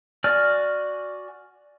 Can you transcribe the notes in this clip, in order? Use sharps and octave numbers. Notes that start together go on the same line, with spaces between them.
F#4 D5 G#5 F6